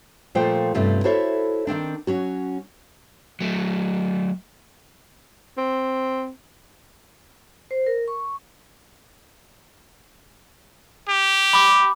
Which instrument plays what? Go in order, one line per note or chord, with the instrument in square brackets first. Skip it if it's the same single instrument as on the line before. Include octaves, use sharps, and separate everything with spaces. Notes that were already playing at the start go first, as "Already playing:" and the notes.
[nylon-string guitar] A#2 F3 A3 F4 C5 G5
G2 C3 A3 C#4 F4
E4 F#4 A4 C5 C#5 E5
D#3 A#3 C4 D4
F#3 C#4 F#4
[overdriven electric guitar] F#3 A3
[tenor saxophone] C4
[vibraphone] C5
A#4
C#6
[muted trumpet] G4
[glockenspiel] B5 D6